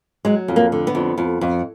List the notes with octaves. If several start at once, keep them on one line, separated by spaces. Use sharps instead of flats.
F#3 G#3
F2
A#3
D3
B3
F2
F2
F2